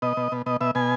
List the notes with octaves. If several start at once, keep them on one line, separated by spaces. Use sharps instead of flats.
B2 D#5
B2
B2
B2 D#5
B2 E5
B2 G#5